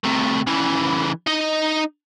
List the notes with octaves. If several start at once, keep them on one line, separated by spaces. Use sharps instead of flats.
A2 C3
C#3 E3
D#4 D#5